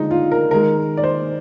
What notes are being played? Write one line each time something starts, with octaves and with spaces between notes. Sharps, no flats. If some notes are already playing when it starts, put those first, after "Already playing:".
Already playing: D3 F3 G#3 D#4
F4
A#4
D#3 G#3 A#4
D5
C5